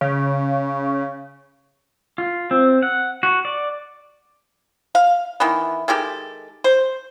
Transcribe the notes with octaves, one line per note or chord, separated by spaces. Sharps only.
C#3
F4
C4
F#5
F#4
D5
F5
D#3 E3 B3
D#3 G#3 G4 A4
C5